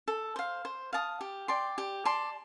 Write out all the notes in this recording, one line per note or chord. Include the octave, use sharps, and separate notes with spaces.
A4
C5 F5
C5
F5 A5 D#6
G4
D5 G5 C6
G4
D5 A5 C6